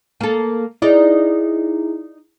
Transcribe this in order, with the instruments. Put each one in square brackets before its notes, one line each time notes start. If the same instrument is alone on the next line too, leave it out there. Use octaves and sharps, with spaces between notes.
[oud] A#3 A4
[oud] D#4 D5 [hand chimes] E4 G#4